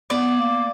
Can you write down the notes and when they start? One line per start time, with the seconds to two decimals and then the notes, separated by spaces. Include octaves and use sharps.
0.10 B3 D5
0.39 A#3